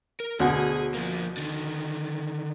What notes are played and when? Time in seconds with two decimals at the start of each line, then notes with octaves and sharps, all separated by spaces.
0.20 A#4
0.40 D2 B2 G#4 G#5
0.94 F3 A#3
1.37 D3 D#3